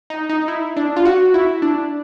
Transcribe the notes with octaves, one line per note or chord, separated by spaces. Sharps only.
D#4
D#4
E4
D4
F4
F#4
E4
D4